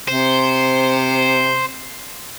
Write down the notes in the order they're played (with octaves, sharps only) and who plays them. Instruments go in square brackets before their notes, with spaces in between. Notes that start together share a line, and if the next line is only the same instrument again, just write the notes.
[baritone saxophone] C3 [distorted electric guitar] C5